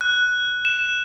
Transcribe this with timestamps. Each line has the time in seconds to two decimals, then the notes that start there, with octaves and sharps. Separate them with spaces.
0.01 F#6
0.65 E7